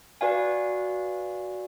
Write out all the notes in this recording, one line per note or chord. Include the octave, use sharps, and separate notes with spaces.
F#4 B4 D5 F5 G#5